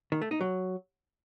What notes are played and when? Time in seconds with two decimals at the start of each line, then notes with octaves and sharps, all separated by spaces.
0.12 D#3
0.21 A3
0.31 D#4
0.41 F#3